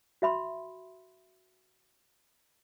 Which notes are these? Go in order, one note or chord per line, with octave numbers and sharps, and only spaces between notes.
F#4 E5 B5 C6